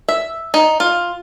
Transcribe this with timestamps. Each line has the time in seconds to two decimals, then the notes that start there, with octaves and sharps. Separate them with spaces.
0.09 E5
0.54 D#4
0.80 F4